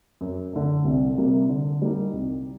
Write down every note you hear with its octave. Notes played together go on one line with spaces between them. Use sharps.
F#2
D3 A3
C2
C3 G3 A#3
D3
G3 A#3 D#4
C2